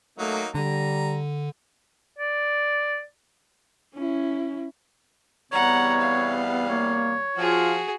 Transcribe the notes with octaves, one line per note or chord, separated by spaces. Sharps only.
F#3 A3 A#3 D#4
D3 G3 A#5
D5
C#4 E4
E2 C3 G3 B3 C#5 F#5 A#5
F5
A#3 C#5
F3 F4 F#4 G#4